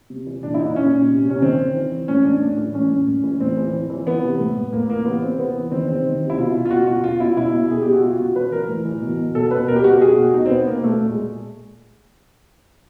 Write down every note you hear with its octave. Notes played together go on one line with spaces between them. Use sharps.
C3
E3
A#2 D4
E4
A#2 D#4
A#2 C#4
A#2
C3
C3 C#4
D#3 C4
D#3
E3
E3
A2 C#4
A2 D4
A2 D4
E3
A2 C#4
A2
A2
E3
A2 C4
E3
E3
E3
E3 B3
C3
A2
A2
A2 A#3
E3 A#3
C3 B3
C3 C4
E3 B3
E3
D#3 C4
C3 C4
D#3
C3
E4
B2 F4
B2
F4
B2 F#4
B2 F#4
B2 F4
B2 E4
B2 E4
B2
B2 G#4
B2 G4
F#4
B2 F4
B2 F#4
E3 B4
E3 A#4
A2
E3
B2
B2
B2 A4
B2 B4
B2 A#4
G4
B2 F#4
G4
B2 G#4
B2 F#4
B2 D#4
C4
B2 B3
B2 A#3
B2 A3
A#2
G#3